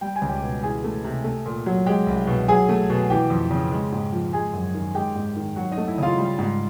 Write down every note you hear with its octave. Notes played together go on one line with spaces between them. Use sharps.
G3 G5
G#5
C#2
G4 G5
B2
E3 G#4 G#5
A3
C3
A3
A#2
F#3
G#3 G4 G5
C2
B2
F#3 G#4 G#5
A3
B2
E3 G4 G5
F2
C#3
G#3
G#2
F3
G#3 G#4 G#5
F#2
D#3
G#3 G4 G5
G#2
D#3
F#3 F#4 F#5
D#4 D#5
A3
E4 E5
C#3 F4 F5
G3
G#2